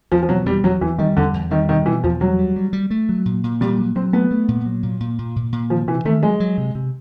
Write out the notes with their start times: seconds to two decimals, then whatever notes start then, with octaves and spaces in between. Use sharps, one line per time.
0.12 E2 F3
0.23 F3
0.29 B2 F#3
0.46 E2 G3
0.64 E2 F#3
0.81 E2 E3
0.98 D#3 G3
1.17 E2 D3
1.34 E2
1.51 D#3 G3
1.68 B2 D#3
1.86 B2 E3
2.03 E2 F3
2.20 F#3 G3
2.39 G3
2.56 G3
2.73 G3
2.90 A3
3.09 F#3
3.26 A#2
3.44 A#2
3.61 A#2 G3
3.79 F#3
3.95 F#3 C4
4.13 A3 B3
4.31 A3
4.48 A#2
4.65 F#3
4.83 A#2
5.00 A#2
5.19 A#2
5.36 A#2
5.52 A#2
5.70 D#3 F3
5.87 C3 E3
6.05 D#3 A3
6.23 F#3 G#3
6.40 F#3
6.58 C3
6.75 C3